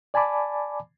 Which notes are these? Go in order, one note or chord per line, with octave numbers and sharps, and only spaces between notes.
D5 G#5 A5 B5 D6